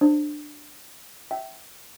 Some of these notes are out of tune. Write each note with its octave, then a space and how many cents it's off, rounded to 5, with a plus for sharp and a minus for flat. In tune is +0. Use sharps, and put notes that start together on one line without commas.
D4 +20 C5 +15
E5 +0 G5 -30